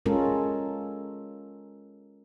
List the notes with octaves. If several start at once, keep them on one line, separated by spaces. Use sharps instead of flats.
G#3 C#4 F4 A4 A#4